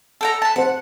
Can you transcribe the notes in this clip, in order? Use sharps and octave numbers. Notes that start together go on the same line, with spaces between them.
A4 G5 A#5
B4 A5
C4 C5 F#5